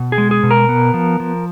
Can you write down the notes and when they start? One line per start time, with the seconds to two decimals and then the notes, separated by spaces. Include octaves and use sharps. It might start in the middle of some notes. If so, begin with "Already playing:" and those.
Already playing: B2
0.12 G#4
0.18 G#3
0.31 G#4
0.43 B2
0.51 A#4
0.69 B3
0.94 F3
1.20 F3